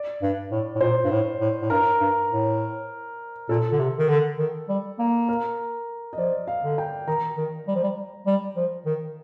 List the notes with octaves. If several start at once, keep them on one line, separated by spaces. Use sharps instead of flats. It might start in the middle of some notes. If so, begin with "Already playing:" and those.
Already playing: D5
G2
A2
A2
A#2 C5
G2
A2
A2
A2
G2 A#4
G2
A2
A#2 A4
D3
C3
D#3
D3
D#3
G3
A#3
A#4
D#5
F3 D5
F5
D3
G5
D#3 A#5
D#3
G3
F3
G3
G3
F3
D#3